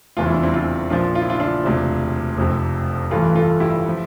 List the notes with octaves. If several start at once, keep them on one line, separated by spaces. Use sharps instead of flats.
F1 E2 E3 G3 F4
E4
D4
C4 E4
D4 F4
A#1 A#2 F3 D4 F4
F4
E4
D4 F4
D4 F4
E1 D2 C3
F1 F2 C3
A1 G2 E3 G3 F4 A4
F4 A4
E4 G4
F3